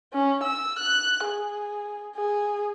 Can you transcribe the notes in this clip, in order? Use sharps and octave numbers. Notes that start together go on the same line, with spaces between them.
C#4
E6
F#6
G#4
G#4